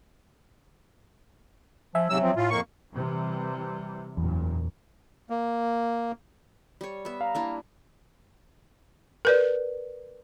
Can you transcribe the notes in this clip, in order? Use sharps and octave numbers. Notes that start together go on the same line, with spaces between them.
F3 E5 G#5
G#2 C3 F#3 E6
F3 C4
A2 F4
F2 A#3 C#6
C3 E3 G3
F#1 E2 A#2
A#3
G3 C#5
B3 E5
F5 A#5
A#3 D4 E4
A#4 B4 D5